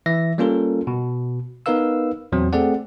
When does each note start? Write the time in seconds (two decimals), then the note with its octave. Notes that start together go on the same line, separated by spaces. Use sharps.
0.06 E3 E5 A#6
0.38 G3 A#3 C#4 F4 A4 A#4
0.87 B2
1.66 B3 D#4 A#4 B4 F5 E6
2.32 E2 A#2 F#3 C4
2.53 A3 C4 G#4 A4 D5 F#5